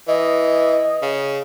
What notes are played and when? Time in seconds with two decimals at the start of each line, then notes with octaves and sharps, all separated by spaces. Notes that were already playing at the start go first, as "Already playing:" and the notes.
0.08 E3 D#5
1.02 C#3